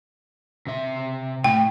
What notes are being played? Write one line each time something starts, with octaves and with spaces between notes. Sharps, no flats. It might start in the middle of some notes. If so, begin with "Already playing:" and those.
C3 E5
A2 G5